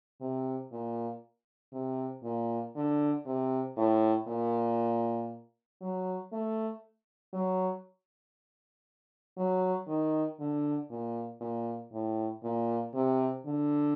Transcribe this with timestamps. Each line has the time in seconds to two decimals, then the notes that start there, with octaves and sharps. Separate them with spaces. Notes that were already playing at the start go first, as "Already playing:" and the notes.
0.21 C3
0.72 A#2
1.73 C3
2.23 A#2
2.75 D3
3.26 C3
3.77 A2
4.28 A#2
5.81 F#3
6.32 A3
7.33 F#3
9.37 F#3
9.88 D#3
10.40 D3
10.90 A#2
11.41 A#2
11.92 A2
12.43 A#2
12.94 C3
13.45 D3